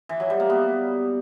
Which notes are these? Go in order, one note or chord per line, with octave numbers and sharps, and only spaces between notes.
E3
F#3
G3
A#3
B3